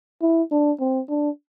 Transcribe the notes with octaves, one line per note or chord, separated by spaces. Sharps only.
E4
D4
C4
D4